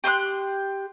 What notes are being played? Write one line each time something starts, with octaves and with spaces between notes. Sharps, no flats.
G4 C6 C#6 F#6